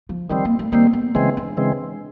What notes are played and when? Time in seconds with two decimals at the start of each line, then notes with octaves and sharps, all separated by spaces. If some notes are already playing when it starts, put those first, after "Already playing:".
0.09 F3
0.30 D#3 F3 G3 C4
0.45 A#3
0.59 A3
0.72 D#3 G3 A#3 C4
0.93 B3
1.15 C#3 E3 G#3 C4 C#4
1.37 D4
1.57 C#3 E3 G#3 C4